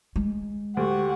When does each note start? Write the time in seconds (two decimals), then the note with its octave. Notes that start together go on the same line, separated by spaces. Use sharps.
0.16 G#3
0.77 D2 G4 F#5 C#6